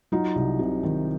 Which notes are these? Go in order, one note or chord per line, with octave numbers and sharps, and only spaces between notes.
F#3 D#4 F4
C2
C3
D#3